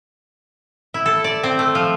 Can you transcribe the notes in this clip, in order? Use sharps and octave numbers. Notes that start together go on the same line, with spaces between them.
E4
A4
D5
C4
A3
F3